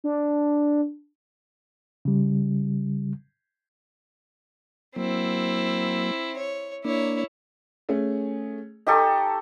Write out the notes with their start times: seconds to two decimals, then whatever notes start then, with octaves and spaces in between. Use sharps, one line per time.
0.04 D4
2.05 C#3 G3
4.96 F#3 A#3 C4 E4
6.37 C#5
6.85 A#3 D4 E4 C#5
7.89 A3 C#4 G#4
8.87 D#4 G4 A4 D#5 G#5 C#6